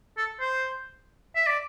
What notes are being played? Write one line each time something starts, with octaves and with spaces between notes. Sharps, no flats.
A4
C5
E5
D5